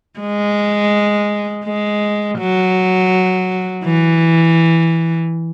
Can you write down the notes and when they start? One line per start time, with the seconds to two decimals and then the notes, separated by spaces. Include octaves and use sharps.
0.20 G#3
1.65 G#3
2.38 F#3
3.84 E3